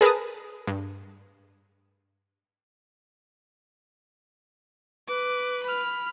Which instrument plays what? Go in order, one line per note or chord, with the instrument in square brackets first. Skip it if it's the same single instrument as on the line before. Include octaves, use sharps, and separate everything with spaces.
[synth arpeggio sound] G#4 A#4 B4 A5 D#6
G2
[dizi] B4 [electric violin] D6
[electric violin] B5 F6